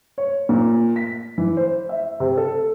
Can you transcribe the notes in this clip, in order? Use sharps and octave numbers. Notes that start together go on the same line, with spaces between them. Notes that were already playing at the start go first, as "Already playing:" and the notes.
C#5
A#2
B6
E3
C5
E5
C3
A4